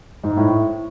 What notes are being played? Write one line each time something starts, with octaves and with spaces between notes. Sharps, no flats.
G#2
A2